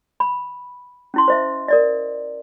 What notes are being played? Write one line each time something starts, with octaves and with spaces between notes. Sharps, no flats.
B5
C#4 E4 C6
C5 D#5 E5
A#4 D5 D#5